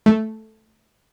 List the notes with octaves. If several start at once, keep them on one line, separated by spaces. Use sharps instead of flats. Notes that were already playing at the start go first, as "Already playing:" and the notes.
A3